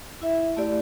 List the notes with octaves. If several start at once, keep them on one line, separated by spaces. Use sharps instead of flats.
E4 E5
A3 E4 G4 D5